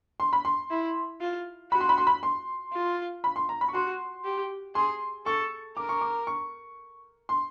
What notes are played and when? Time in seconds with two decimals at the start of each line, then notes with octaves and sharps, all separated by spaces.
0.20 C6
0.33 B5
0.45 C6
0.70 E4
1.21 F4
1.72 F#4 B5
1.81 C6
1.89 B5
1.98 C6
2.07 B5
2.23 C6
2.73 F4
3.24 B5
3.36 C6
3.49 A#5
3.61 B5
3.68 C#6
3.74 F#4 C6
4.25 G4
4.75 G#4 C6
5.26 A4 C#6
5.77 A#4 D6
5.89 C#6
6.01 D6
6.27 C#6
7.29 C6